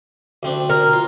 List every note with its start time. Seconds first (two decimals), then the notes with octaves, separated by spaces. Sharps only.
0.43 D2 C4 D4
0.70 A#4
0.93 F4